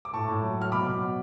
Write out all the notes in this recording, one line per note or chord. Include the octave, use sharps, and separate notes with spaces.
D6
A2 A5 C#6
A2
F#3
F#3 F6
B2 B5 D6
B2
F#3